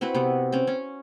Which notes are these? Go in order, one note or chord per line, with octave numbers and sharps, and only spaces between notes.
C4 E4 F#4 B4
C3 B3
C4 C#4
C#4